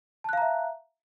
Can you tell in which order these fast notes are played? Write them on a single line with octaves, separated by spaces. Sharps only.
A5 F#6 F5 A#5 E5